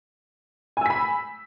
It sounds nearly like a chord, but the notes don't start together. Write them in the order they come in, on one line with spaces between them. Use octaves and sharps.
G#5 E6 B6 B5